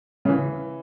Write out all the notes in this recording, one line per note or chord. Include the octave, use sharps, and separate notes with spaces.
C#3
E3